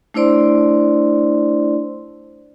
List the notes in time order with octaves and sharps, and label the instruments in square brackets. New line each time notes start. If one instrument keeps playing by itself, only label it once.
[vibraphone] A3 D4 E4 C5 D5 C6